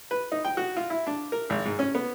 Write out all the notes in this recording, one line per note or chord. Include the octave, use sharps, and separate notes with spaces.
B4
D#4
G5
F#4
F4
E4
D4
A#4
G#1
G#2
C#4
B3